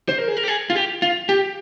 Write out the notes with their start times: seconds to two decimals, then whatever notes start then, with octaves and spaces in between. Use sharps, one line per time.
0.09 C5
0.18 A#4
0.28 G#4
0.37 A#4
0.43 G4
0.48 G#4
0.70 F4
0.75 G4
1.02 F4
1.29 G4